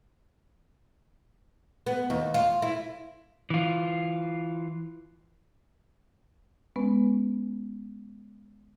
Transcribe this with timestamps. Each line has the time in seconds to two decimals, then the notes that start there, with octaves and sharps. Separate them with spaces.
1.86 B3
2.10 D#2
2.34 F4
2.62 E4
3.50 E3 F4
6.76 G#3 B3 C#4 B4